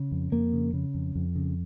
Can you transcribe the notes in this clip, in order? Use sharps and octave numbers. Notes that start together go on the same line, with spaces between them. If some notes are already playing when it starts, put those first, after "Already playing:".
Already playing: C#3
F2
F2 A#3
C#3
C#3
F2
F2
C#3